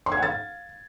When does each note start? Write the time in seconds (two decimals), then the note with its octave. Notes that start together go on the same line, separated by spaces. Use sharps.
0.06 C6
0.12 G#6
0.17 F#5
0.23 A6
0.28 F5